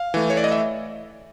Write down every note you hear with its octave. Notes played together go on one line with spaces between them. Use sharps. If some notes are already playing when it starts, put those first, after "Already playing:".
Already playing: F5
E3 A3
C#5
D5
D#5
E5